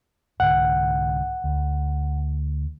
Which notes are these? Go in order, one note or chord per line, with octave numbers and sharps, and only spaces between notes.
C2 G#2 D3 F#5
D2